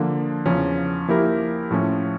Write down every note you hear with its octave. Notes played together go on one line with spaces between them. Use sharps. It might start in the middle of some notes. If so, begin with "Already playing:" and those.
Already playing: D3 F3 A#3
E2 C#3 F3 C#4
F3 A#3 E4 G4 A#4
A2 F3 C#4